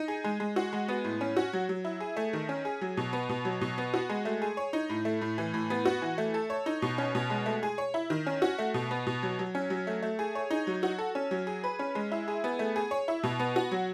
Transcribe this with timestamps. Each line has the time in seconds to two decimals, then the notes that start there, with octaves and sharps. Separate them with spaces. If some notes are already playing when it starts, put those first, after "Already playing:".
Already playing: D#4
0.08 G#4
0.24 G#3
0.40 G#3
0.56 F#4
0.73 G#3
0.88 B3
1.04 A2
1.21 C#4
1.37 F#4
1.53 F#3
1.69 F#3
1.85 E4
2.00 G#4
2.17 A3
2.33 D#3
2.49 C#4
2.65 G#4
2.81 F#3
2.97 B2
3.13 B3
3.29 B2
3.45 F#3
3.61 B2
3.78 B3
3.94 F#4
4.09 G#3
4.25 A3
4.42 G#4
4.57 C#5
4.73 D#4
4.90 A2
5.05 A3
5.21 A2
5.38 E3
5.54 A2
5.70 B3
5.85 F#4
6.02 E3
6.18 A3
6.34 A4
6.50 C#5
6.66 D#4
6.82 B2
6.98 C#4
7.15 B2
7.30 G#3
7.46 A3
7.63 G#4
7.78 C#5
7.94 E4
8.10 D#3
8.27 C#4
8.42 F#4
8.58 A3
8.74 B2
8.91 B3
9.07 B2
9.23 F#3
9.39 F#3
9.55 C#4
9.70 F#3
9.87 A3
10.02 A3
10.19 G#4
10.35 C#5
10.51 D#4
10.67 F#3
10.83 F#4
10.98 A4
11.15 C#4
11.31 F#3
11.47 G#4
11.64 B4
11.79 C#4
11.95 G#3
12.12 E4
12.28 G#4
12.44 B3
12.59 A3
12.76 G#4
12.91 C#5
13.08 E4
13.23 B2
13.39 B3
13.56 F#4
13.71 F#3